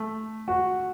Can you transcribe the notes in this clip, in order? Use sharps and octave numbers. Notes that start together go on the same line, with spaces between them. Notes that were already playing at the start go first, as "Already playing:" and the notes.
Already playing: A3
F#4